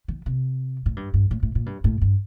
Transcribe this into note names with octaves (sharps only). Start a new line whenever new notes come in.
D#3
C3
A2
G2
G2
A2
A2
A#2
G2
A2
G2